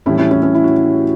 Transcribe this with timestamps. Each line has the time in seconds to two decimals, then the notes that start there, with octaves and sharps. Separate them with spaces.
0.06 A2 E3 G3 C#4 E4
0.18 C#4 E4
0.31 C#4 E4
0.42 C#4
0.54 E4
0.64 F#4